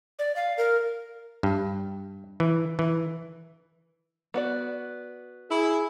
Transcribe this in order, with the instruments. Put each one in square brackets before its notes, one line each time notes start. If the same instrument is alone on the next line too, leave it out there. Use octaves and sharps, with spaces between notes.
[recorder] D5
F5
A#4
[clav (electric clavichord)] G2
E3
E3
[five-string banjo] B3 F#4 D5
[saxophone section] E4 [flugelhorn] G#4